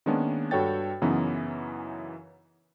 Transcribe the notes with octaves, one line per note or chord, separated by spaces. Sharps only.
D#3 G#3 A#3 B3 C#4 D4
G2 F#4 A4 C#5 G5 A6
F#2 C#3 E3 F#3 B3 D#4